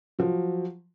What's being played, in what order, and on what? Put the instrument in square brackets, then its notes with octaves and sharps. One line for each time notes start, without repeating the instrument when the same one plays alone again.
[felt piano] F3 F#3